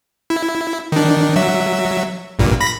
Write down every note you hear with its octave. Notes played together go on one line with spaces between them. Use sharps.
E4
D#3 D4
F#3 E5
A#1 G2 A#2
B5 A#6 B6